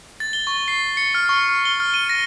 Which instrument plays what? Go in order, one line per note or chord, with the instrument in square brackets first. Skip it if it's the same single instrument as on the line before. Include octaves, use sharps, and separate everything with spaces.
[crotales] A6
G7
C#6
C7
C#7
F6
C#6
F6
G7
F6
D#7
A#6